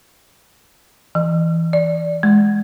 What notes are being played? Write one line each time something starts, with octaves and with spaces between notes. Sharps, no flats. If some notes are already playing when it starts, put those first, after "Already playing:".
E3
D5
G#3